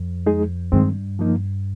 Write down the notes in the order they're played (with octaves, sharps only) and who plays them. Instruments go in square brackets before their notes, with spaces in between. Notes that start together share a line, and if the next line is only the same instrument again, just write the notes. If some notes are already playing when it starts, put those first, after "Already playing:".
Already playing: [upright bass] F2
[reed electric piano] G#3 D#4 G#4
[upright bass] G2 [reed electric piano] D#3 G#3 C4
[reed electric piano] F3 A#3 D#4